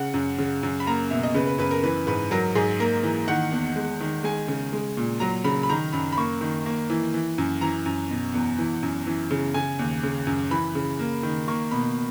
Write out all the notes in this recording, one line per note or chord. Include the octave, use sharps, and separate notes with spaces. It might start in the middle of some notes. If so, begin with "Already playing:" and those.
Already playing: C#3 F#5
F#2
C#3
F#2
B5
A#3 A#5
B2 E5
D#5
C#3 B4
B4
F#2 B4
A#4
E3 B4
G#2 B4
F#3 A#4
G#2 G#4
A#3 A#4
E3
D#3 F#5
E2
G#3
D#3
G#3 G#5
C#3
G#3
A#2
F#3 A#5
C#3 B5
B5
D#3 A#5
F#2 B5
B5
A#3 C#6
D#3
A#3
E3
E3
F#2
E3 A#5
F#2
B2
E2
E3
F#2
E3
C#3
C#3 G#5
D#2
C#3
F#2
E3 B5
C#3
A#3
D#3
A#3 C#6
B2 B5